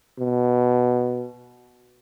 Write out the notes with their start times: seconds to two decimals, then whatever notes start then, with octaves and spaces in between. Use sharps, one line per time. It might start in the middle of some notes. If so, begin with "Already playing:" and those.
0.19 B2